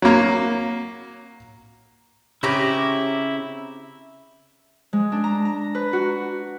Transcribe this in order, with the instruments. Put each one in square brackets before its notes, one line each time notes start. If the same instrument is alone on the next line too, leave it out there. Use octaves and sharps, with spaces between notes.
[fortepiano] F#3 A#3
[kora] C#3 C4 G4 [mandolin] C#4 A#5 D6 [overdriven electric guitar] E4
[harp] G#3
D4
A#5
A#5
B4
F#4